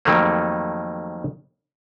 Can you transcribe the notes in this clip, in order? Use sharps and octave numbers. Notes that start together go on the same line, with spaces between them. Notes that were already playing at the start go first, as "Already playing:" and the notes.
F2 D#3 F#3 G3 A3 A#3